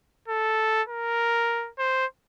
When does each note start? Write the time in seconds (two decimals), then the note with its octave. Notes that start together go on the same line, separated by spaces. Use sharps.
0.28 A4
0.88 A#4
1.79 C5